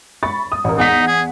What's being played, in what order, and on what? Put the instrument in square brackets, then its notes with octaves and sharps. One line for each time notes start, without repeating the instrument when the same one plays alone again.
[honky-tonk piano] B5 C#6 A6
D#6
A1 A#4
[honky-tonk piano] E2 F#5 B6 [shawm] D#4
[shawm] G#4